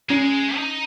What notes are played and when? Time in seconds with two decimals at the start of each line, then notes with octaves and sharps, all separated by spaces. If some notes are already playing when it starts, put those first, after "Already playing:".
0.09 G#3 C#4
0.56 D#4